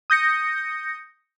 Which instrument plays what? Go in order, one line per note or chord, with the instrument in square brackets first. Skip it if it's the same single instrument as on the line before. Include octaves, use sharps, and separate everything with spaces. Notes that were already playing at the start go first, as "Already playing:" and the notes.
[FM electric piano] D#6 G6 A#6 C#7